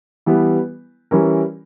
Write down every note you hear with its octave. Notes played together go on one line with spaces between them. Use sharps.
E3 G3 B3 E4
E3 G3 C#4 E4 A#4